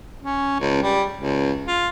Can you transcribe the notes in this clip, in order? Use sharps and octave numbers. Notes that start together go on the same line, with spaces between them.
C#4
C#2
G3
C#2
F4